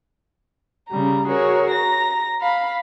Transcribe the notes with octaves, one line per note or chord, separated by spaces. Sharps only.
C#3 G3 A#5
F#4 G#4 A#4 C#5
A#5 A#6
F5 B5